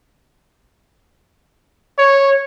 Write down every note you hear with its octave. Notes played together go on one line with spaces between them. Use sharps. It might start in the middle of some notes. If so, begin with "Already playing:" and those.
C#5